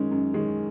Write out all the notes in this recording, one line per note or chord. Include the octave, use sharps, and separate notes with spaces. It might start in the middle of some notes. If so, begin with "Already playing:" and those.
Already playing: F#2 D#3 G#3 C#4
F#2
D#3 G#3 C#4